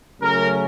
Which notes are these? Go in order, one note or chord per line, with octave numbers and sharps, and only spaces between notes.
C#3 F#3 A3 C#4 A#4